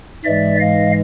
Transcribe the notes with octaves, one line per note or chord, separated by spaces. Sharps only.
G#2 E3 G#3 D5 E5
D#5 F5